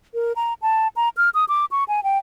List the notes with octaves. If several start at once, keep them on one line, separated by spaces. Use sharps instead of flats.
A#4
A#5
A5
A#5
F6
D#6
D6
C#6
G#5
G5